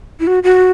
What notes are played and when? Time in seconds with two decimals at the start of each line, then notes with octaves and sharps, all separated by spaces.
0.20 E4
0.27 F#4
0.43 F#4